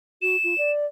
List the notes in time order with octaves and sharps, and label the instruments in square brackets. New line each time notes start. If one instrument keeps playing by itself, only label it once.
[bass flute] F#4 [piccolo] E7
[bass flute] F4
D5